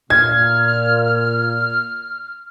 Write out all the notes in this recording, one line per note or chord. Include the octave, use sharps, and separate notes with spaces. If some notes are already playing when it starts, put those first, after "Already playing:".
A#2 F6 G#6